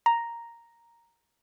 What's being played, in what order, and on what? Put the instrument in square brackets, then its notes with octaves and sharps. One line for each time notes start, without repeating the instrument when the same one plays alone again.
[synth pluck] A#5